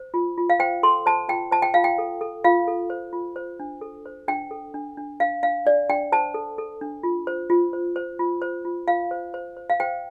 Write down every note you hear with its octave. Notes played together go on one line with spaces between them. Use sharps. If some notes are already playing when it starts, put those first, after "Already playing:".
Already playing: C5
F4
F4
F5
C5 G5
A4 C6
C5 A5
F4 G5
C5 A5
G5
F4 F5
G5
A4
A4
F4 F5
A4
C5
F4
C5
D4
A4
C5
D4 G5
A4
D4
D4
D4 F5
D4 F5
D4 D5
D4 G5
C5 A5
A4
A4
D4
F4
C5
F4
C5
C5
F4
C5
F4
F4 F5
C5
C5
C5
F5
C5 G5